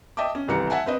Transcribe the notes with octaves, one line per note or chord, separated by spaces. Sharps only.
D#5 E5 G5 A5 D6
C#4
D#1 C2 E3 A#5 C#7
E5 F#5 G#5 A5
C4 B4 D#5